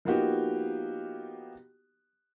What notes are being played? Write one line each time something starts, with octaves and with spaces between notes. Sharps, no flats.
F3 A#3 B3 D#4 F#4 G4